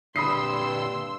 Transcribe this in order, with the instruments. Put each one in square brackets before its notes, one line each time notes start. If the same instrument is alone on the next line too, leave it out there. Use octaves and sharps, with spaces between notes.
[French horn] G2 [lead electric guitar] A#2 D3 [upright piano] B5 D#6 C7 [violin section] C6 E6